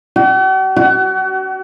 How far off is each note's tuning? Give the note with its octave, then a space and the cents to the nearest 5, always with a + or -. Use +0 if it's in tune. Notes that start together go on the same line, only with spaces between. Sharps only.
F#4 +45
F#4 +30